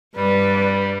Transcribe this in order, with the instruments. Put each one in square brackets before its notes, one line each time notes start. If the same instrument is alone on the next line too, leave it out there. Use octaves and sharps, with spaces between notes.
[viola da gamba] G2 [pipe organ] G3 [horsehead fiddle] B4 D5